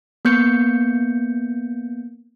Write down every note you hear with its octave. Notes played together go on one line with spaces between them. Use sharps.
A#3 B3 G6 C#7